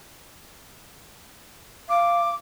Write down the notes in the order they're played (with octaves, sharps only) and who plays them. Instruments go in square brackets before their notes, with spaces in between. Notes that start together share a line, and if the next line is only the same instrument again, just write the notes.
[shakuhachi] F5 [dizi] D6